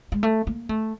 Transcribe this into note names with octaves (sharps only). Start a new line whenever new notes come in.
G#3
A3
A#3
A3